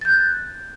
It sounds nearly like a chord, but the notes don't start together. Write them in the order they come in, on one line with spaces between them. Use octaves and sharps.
A6 G6 F#6